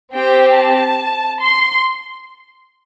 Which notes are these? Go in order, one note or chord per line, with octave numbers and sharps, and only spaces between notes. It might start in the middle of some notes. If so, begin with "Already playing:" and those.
C4 G4 G5
A5
C6